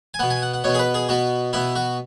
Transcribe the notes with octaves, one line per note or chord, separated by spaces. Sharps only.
G#5
B2 B3 F#5
G#5
F#5
F#5
B2 B3 C#5
G#4
B4
G#4
B2 B3 F#4
B2 B3 E4
F#4